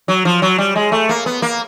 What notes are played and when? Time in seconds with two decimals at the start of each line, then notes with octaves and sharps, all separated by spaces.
0.08 F#3
0.25 F3
0.42 F#3
0.58 G3
0.75 G#3
0.92 A3
1.09 A#3
1.26 B3
1.42 A#3